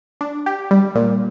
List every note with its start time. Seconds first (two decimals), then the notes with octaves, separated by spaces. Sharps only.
0.21 D4
0.46 G4
0.71 G3
0.95 A#2